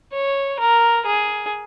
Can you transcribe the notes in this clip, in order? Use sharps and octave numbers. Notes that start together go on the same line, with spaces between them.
C#5
A#4
G#4